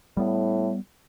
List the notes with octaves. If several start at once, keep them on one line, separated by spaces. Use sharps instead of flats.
A2 G3 B3